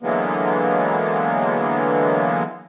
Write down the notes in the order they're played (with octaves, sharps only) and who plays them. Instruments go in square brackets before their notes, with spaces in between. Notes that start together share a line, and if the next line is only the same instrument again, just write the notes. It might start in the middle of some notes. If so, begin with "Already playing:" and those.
[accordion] D3 E3 F#3 G#3 A#3 B3